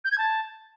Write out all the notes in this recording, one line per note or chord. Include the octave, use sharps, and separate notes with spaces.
G6
G#6
A5